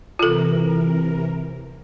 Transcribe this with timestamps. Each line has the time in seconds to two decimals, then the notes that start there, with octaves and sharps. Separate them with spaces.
0.19 C3 E3 F4 A4 A#4